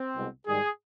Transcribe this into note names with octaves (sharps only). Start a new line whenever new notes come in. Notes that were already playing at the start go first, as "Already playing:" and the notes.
Already playing: C4
C2 B2 G#3
G#2 D#3 G3 G#4